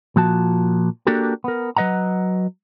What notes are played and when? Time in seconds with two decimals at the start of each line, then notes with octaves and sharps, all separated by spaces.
0.16 A#2 F3 F#4 A5
1.07 A#3 D4 F#4 G4 A4 A#4
1.44 B3 A#4
1.76 F#3 B4 D#5 F#5 A#5